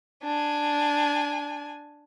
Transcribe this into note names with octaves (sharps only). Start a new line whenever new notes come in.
D4 G#5